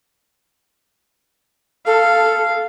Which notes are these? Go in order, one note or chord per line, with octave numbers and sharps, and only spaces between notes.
A4 F5